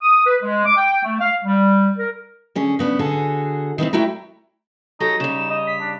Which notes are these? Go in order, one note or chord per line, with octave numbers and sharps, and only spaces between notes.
D#6
B4
G#3
D6
G5
A3
F5
G3
A#4
D3 C#4 G#4
C#3 B3 D4
D3 F#4 G#4 A4
D#3 E3 A#3 C4
G3 A3 E4 F#4 G5 A#5
F#3 D#4 G4 A4 A#6
C#3 G3 E7
D#5
B6
D4